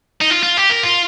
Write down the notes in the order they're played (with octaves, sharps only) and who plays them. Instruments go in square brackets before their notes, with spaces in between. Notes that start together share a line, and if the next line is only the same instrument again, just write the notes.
[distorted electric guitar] D#4
F4
F4
G4
A#4
F4